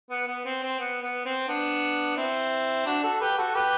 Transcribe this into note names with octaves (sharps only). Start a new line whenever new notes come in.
B3
B3
C4
C4
B3
B3
C4
B3 D4
C4 E4
D4 F#4
F#4 A4
G4 B4
F#4 A4
G4 B4